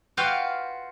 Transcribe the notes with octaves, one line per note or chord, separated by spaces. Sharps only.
F4 F#4 B4 F5 G5